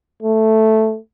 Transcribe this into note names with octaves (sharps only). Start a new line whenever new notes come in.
A3